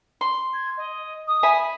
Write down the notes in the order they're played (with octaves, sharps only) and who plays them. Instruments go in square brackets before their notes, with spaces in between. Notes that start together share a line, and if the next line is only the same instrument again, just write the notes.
[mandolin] C6
[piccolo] G#6
D#5
D#6
[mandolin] E5 G#5 B5